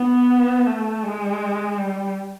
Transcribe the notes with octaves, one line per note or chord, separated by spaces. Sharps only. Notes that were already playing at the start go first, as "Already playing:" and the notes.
Already playing: B3
A3
G#3
G3